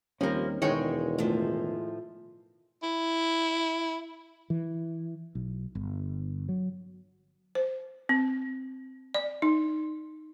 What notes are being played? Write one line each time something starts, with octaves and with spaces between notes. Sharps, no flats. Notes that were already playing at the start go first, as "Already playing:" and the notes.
D#2 F3 G3 A#3 C4 C#4
E1 D#3 E3 G#3 C#5 G5
A2 F3
E4
E3
B1
G1
F#3
C5
C4
D5
D#4